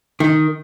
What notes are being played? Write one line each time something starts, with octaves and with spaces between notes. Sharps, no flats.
D#3